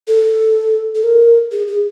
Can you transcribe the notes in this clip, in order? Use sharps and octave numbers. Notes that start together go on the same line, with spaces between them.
A4
A4
A#4
G#4
G#4